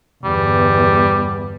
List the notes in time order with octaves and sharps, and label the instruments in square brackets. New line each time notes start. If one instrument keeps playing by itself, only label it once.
[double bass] G1 E2 [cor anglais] G3